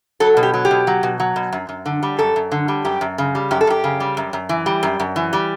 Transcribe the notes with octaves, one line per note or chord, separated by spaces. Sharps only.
F#3 A4
B2
G4
F#3
G4
B2
F#3
B2
F#3
B2
F#2
F#2
D3
G3
F#2 A4
F#2
D3
G3
F#2 G4
F#2
C#3
G3
F#2 G4
A4
F#2 G4
C#3
G3
F#2
F#2
E3
G3
F#2
F#2
E3
G3